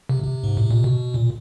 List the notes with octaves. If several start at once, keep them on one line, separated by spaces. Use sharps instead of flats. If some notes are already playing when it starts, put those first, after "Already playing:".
C3
C3
G#2
A2
A#2
B2
A#2